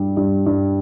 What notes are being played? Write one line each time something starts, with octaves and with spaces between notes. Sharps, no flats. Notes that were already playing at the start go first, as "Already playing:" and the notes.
Already playing: G2 G3
G2
G2